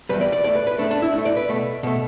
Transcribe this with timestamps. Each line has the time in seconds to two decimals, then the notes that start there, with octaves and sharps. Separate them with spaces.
0.09 E2 B2 G3 B4
0.21 D5
0.32 D5
0.44 A2 D5
0.47 A3
0.55 B4
0.67 B4
0.78 A2 A3 D4
0.91 D4
1.02 E4
1.13 A2 A3
1.25 D5
1.37 B4
1.49 B2 A3
1.83 B2 A3